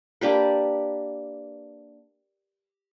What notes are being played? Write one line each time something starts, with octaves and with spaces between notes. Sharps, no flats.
A#3 D4 G4 B4